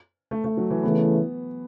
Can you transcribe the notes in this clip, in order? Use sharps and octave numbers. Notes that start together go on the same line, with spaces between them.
A3
A3
F#3
E3
C#3 E3 A3 B3 E4